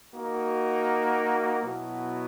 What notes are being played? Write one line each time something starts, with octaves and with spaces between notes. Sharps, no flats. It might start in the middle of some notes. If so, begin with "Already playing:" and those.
A#3 D#4 F#4
B2 F#3 B3 E4